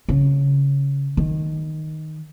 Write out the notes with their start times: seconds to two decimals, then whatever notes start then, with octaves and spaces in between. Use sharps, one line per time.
0.09 C#3
1.17 D#3